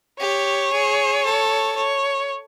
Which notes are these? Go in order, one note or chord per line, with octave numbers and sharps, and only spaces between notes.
G4 C#5
G#4
A4
C#5